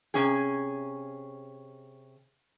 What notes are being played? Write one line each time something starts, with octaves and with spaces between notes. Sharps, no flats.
C3 C#4 G#4